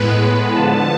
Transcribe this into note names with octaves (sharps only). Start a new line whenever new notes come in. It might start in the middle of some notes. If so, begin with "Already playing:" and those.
Already playing: A2 G#3 B3 B4
D3 F3 B3 A5